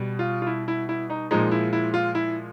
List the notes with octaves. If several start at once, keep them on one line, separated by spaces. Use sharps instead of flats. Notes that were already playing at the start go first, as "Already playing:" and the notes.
Already playing: B2 G3
F4
F4
E4
E4
E4
D#4
A#2 F3 G#3 D#4
E4
E4
F4
E4